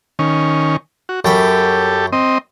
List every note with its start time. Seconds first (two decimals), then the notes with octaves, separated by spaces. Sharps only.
0.19 D#3 C#4
1.09 F#4
1.25 F#2 G4 A4 G5 B5
2.12 C4 D#5